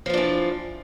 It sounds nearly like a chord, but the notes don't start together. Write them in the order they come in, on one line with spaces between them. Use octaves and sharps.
F3 F4 D4 E3